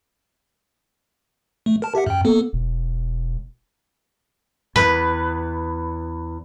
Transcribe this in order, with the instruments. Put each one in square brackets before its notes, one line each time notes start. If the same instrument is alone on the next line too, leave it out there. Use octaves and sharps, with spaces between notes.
[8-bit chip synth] A3
A#4 A5
G4 E5 F#5
F#2 G5
A#3 B3 A4
[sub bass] E1
[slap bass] E2 [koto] B4